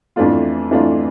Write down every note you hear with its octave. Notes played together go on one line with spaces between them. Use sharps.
F2 E3 A3 D4 F4
F2 E3 A3 D4 F4